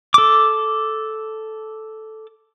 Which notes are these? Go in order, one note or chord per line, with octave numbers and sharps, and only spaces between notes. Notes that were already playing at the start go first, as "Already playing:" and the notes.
A4 D6